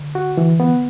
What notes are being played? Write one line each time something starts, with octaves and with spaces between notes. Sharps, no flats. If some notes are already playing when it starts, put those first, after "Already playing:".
Already playing: D3
F#4
E3
B3